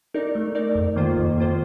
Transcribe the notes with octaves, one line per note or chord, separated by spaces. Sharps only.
D#4 A#4 D5
A3
D#4 A#4 D5
F2
D#3 A#3 F4 C5
F2
D#3 A#3 F4 C5